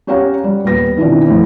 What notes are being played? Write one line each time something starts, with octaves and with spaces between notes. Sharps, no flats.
C#4 G4 C#5 F5 F#5 A#5
G3
D#1 B3 A#6
B2 D#3 E3 C4 D4 F4
F2 A2